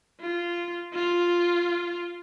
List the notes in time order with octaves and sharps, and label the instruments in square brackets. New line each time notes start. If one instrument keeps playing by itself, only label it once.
[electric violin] F4
F4